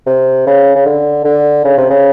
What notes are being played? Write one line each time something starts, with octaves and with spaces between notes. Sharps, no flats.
C3
C#3
C#3
D3
D3
C#3
C3
C#3